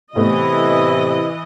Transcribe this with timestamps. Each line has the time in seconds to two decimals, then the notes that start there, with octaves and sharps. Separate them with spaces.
0.16 A2 C3 E3 A3 B3 E4 D#5